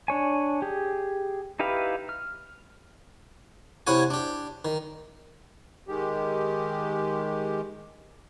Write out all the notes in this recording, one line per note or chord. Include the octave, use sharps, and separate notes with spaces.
D4 C#5 G#5
G4 G#4
D#4 E4 G4 B4 F5
F6
C3 E4 C5 C#5 F#5 G#5
D4 G4
D#3
D#3 G#3 G4